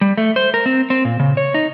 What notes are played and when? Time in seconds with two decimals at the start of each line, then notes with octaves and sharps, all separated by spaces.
0.01 G3
0.18 A3
0.36 C5
0.54 A#4
0.66 C4
0.90 C4
1.05 A#2
1.20 C#3
1.37 C#5
1.54 D#4